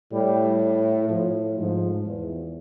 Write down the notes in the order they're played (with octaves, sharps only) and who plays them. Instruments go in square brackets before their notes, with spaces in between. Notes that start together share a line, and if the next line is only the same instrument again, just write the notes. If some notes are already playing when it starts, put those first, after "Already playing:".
[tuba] A2 [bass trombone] G3
[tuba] A2 [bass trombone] F3
[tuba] G#2 [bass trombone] F3
[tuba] E2